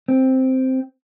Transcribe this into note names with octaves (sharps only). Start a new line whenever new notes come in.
C4